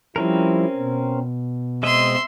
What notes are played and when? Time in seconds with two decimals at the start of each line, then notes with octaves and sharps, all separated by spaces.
0.16 F3 G3 C4 C#4 E4 A#4
0.77 B2
1.83 G#3 C4 D#5 E5 C6